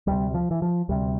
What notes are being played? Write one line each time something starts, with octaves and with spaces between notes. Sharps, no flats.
D2 C3 G3
F3
E3
F3
D2 C3 G3